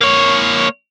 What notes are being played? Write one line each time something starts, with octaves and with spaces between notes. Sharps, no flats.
A#3 C#5